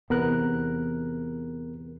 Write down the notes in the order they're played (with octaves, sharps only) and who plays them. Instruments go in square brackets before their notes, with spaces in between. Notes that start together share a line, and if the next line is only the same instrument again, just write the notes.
[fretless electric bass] E2 C3 [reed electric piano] B3 A#4 F#6